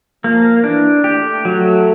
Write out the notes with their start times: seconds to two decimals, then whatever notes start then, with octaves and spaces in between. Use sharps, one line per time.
0.24 F3 A#3
0.64 E3 D4
1.04 A3 G4
1.45 F#3